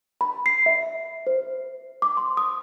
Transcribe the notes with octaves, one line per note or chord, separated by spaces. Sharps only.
B5
C7
E5
C5
D6
C6
D#6